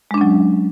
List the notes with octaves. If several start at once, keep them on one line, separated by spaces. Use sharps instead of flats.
F#3 G#3 C#4 D4